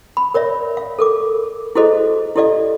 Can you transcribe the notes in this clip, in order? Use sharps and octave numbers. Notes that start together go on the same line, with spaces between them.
B5
A#4 C#5 D5 E5
F5
A4 A#4 D6
E4 F#4 G#4 A4 C5 D#5
E4 G4 A4 D5 D#5 F5